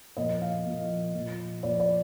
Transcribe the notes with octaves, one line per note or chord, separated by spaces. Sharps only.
A#2 F3 D#5
F5
A#2 F3
A#2 F3
A#2 F3 D5
D5